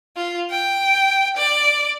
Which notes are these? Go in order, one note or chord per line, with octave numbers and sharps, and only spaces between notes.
F4
G5
D5